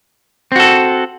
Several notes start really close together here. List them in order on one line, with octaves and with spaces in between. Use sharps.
C4 F#4 A4